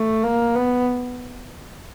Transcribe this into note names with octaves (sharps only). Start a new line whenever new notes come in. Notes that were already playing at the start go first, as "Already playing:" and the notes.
Already playing: A3
A#3
B3